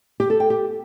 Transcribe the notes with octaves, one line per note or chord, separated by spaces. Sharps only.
G4
A4
G5
G4